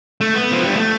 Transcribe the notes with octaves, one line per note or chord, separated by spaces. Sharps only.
A3
B3
F3
G3
A3